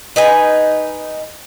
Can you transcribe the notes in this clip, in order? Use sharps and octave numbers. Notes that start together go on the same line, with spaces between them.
D#4 B4 G#5